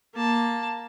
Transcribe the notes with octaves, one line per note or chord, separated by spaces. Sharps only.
A#3 A5